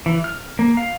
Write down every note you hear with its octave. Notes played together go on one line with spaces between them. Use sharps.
E3
F6
A#3
F5